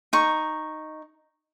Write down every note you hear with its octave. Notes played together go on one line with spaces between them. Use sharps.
D#4 C#6